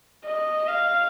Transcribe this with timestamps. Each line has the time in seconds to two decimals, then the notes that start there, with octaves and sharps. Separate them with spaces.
0.25 D#5
0.68 F5